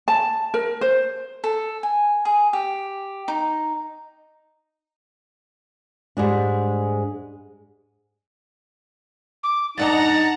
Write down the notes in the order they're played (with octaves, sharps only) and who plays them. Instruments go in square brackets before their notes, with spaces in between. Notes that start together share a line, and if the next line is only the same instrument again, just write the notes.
[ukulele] A5
A#4
C5
[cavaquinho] A4
G#5
G#4
G4
D#4
[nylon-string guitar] G#2 G3 G#3 D4
[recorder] D6
[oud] F#2 D4 D#5 [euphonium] D#4 [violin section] F#5 A5 A#5 [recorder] A6